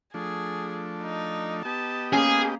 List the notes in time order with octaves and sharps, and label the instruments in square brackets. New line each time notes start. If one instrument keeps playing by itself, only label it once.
[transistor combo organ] F3 A3 D4 [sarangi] G#4
[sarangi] D#4
[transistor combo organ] B3 G4 D#5 [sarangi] A5
[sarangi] A#3 [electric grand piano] C#4 [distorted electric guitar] G#4